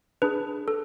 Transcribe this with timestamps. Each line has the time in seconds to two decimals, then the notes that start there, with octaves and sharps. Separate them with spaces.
0.22 D4 G#4 B4
0.68 A4